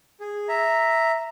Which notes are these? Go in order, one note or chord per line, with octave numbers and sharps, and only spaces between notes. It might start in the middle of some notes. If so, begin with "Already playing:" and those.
G#4
E5 A#5